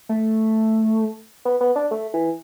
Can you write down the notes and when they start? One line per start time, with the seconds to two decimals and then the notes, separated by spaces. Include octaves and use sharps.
0.09 A3
1.45 B3
1.61 B3
1.76 D4
1.91 A3
2.14 E3